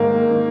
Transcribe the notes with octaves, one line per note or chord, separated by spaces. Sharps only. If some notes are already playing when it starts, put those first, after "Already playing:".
Already playing: G#2 D#3 A#3
D#3